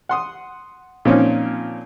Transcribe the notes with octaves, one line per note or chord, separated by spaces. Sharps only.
F#5 C6 D#6
A#2 F3 C4 C#4 D#4